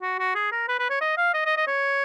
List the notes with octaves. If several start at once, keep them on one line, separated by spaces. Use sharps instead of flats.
F#4
F#4
G#4
A#4
B4
B4
C#5
D#5
F5
D#5
D#5
D#5
C#5